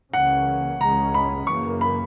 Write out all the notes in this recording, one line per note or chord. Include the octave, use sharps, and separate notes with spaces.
C#2 C#3 E3 A#3 C#4 F#5
C#2 C#3 G#3 C#4 A#5
B5
F#2 C#3 E3 A#3 C#6
B5